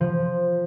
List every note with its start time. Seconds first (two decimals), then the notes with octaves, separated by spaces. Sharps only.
0.01 F3